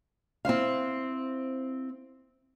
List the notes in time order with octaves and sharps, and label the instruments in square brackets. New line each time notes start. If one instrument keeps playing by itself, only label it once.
[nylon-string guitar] C4 E4 C5 F5